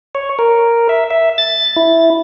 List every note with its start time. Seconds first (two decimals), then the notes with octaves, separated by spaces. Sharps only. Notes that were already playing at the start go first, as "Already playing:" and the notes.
0.15 C#5
0.39 A#4
0.89 E5
1.11 E5
1.38 A6
1.76 E4